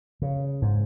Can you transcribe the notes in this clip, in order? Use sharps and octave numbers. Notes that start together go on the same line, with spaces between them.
C#3
G#2